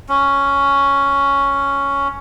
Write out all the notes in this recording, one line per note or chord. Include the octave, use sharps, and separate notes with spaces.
C#4